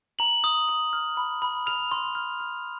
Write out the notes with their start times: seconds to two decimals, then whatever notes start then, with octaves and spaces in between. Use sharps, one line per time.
0.19 A#5 F#7
0.44 D#6
0.69 D#6
0.93 F6
1.17 B5
1.42 B5
1.66 F6 F7
1.92 C6
2.15 F6
2.40 F6